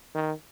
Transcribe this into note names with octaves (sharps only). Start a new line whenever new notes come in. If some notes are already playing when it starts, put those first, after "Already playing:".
D#3